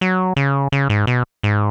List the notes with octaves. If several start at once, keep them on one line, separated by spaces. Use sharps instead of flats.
F#3
C#3
C#3
G#2
B2
G#2